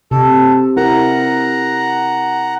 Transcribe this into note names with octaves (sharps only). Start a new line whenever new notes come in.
C3 A4
E4 A#4 F#5 A#5